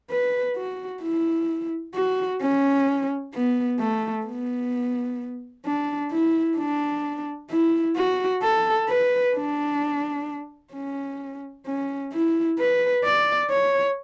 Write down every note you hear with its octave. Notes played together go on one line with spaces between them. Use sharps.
B4
F#4
E4
F#4
C#4
B3
A3
B3
D4
E4
D4
E4
F#4
A4
B4
D4
C#4
C#4
E4
B4
D5
C#5